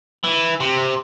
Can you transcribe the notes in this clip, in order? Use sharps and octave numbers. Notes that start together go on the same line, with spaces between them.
E3
C3